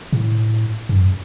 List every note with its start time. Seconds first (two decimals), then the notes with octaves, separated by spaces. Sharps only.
0.13 A2
0.89 F#2